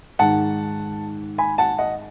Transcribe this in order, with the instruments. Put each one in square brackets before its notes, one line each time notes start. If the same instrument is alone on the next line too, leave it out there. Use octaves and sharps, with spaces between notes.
[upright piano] G#2 D#3 F#5 A5
G#5 B5
F#5 A5
D#5 F#5